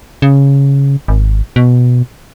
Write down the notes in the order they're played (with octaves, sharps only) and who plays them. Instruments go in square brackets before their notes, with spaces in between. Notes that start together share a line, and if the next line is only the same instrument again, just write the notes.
[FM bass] C#3
G#1
B2